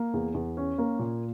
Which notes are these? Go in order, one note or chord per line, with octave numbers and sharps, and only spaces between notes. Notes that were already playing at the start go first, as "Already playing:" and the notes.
Already playing: A#3
E2
E2
C#4
A#3
A#2